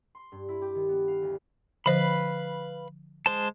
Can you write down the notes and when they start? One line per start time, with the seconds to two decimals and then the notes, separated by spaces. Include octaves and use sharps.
0.15 C6
0.32 G2
0.49 E4
0.62 G4
0.75 D#3
0.89 B3
1.08 F5
1.22 D2
1.86 D3 F3 B4 C5 F5 B5
3.26 G#3 C5 A5